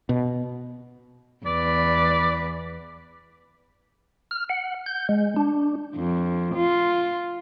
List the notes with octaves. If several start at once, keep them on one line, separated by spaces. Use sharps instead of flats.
B2
E2 B4 D5
F6
F#5
G6
G#3
D4
F2
F4